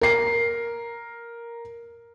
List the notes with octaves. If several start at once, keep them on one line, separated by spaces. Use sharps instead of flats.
A#4 C7